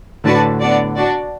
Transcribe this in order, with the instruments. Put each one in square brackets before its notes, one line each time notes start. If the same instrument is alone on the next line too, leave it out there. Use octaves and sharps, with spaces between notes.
[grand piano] A2 D3 [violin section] D4 F#4 B4 D5 A5
[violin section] B3 D4 F#4 D5
D4 F#4 D5